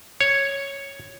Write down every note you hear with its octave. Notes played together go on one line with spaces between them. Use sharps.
C#5